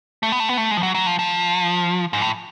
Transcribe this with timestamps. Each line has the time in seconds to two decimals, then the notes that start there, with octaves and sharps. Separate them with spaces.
0.23 A3
0.32 B3
0.40 A3
0.49 B3
0.58 A3
0.71 G#3
0.77 F3
0.83 F#3
0.95 F#3
1.07 F3
1.19 F3
2.13 G#2
2.21 A2